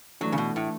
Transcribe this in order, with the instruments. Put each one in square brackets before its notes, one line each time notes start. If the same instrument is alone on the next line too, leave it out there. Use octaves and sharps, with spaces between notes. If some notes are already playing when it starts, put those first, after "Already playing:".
[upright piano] E3 A3 D4 [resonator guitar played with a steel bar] F#3
[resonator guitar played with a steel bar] C#3
B2
A2